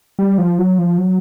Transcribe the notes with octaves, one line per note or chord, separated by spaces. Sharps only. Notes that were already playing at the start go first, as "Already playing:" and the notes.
G3
F3
F#3
F3
F#3